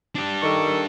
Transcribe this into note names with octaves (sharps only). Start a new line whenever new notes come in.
D4 G4
D#3 A4 C#6